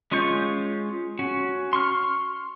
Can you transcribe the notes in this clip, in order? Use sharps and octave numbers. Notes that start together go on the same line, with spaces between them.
G#3 C#4 F4 C#6 G6
C#4 F#4
C6 C#6 F6